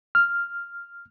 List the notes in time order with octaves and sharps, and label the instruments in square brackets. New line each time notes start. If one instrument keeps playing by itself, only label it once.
[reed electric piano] F6